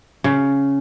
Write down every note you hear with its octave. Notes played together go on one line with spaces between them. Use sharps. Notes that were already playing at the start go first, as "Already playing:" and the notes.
C#3